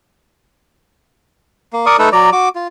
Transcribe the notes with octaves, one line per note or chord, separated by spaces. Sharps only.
A#3
A#4 D5 C#6 D#6
A3 D#4 A4 B4
F#3 D5 A#5
F#4 D6
F4